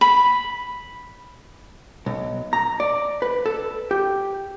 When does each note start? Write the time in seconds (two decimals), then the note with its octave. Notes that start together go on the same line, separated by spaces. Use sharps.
0.01 B5
2.06 B1
2.53 A#5
2.80 D5
3.22 B4
3.46 A4
3.91 G4